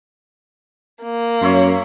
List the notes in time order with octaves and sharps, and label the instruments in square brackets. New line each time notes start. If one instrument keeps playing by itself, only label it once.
[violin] A#3
[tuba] F#2 [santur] C#5 E5 C6